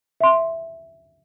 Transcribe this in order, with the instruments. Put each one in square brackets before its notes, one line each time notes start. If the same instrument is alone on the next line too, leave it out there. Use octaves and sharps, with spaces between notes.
[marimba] E5 C6